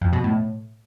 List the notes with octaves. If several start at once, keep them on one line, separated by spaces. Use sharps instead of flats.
F2
B2
A2